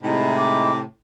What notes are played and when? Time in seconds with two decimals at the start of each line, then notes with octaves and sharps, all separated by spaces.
0.02 A2 C3 G#3 D#4 E4
0.37 D6